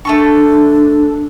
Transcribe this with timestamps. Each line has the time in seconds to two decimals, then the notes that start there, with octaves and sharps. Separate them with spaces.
0.05 A3 D4 A4 C#6